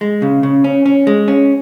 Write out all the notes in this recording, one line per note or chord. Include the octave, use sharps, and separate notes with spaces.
G#3
C#3
C#3
C#4
C#4
G#3
C#4